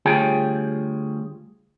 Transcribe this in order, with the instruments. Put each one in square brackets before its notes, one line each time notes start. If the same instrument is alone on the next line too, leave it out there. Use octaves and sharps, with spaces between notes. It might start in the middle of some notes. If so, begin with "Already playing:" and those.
[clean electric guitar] D2 G3 F4 G#4 C#5 G5